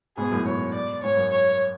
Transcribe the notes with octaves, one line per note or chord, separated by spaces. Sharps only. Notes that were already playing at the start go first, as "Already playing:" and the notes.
G#2 B2 G#4
F#2 A2
G#2 B2 C#5
D5
G#2 C#5
F#2
C#5